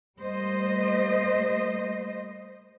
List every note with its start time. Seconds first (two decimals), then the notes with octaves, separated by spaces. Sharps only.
0.19 G3 A3 A#3 C5 D#5